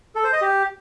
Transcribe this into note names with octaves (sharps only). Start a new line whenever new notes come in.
A4
C5
D#5
G4